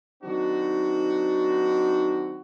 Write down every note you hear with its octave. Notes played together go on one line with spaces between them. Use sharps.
D#3 F#3 C4 D4 D#4 F#4